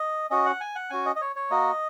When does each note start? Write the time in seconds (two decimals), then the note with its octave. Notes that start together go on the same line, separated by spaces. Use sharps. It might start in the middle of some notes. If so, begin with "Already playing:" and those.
Already playing: D#5
0.30 C#4 F#4 D#5
0.46 F#5
0.61 G#5
0.75 F#5
0.90 C#4 F#4 G#5
1.06 D#5
1.16 D#5
1.21 C#5
1.36 C#5
1.50 A#3 F#4 D#5